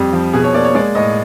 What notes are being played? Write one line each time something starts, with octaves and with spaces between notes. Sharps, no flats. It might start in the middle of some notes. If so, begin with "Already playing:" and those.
Already playing: F2 G3 G4
F3
B2 G#4
C#5
A#3 D5
C#5
G#3 D5
A2 D#5